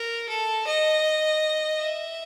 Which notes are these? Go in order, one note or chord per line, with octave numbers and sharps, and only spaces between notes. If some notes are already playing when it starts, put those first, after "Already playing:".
Already playing: A#4
A4
D#5
E5